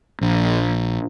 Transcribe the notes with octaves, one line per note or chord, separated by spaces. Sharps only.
A#1